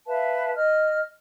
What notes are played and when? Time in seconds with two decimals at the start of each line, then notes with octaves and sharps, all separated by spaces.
0.07 B4 E5 F5 A5
0.55 D#5 F6